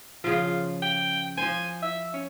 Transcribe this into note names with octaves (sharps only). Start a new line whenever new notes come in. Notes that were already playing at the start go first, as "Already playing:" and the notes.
C#3 F3 F4
G5
F3 C5 G#5
E5
C#4